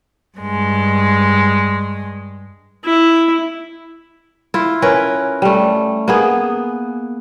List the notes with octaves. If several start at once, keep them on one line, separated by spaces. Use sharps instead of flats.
G2 G#3
E4
E4 F4
C#4 A#4 B4
G3 A3
A#3 B3 G#4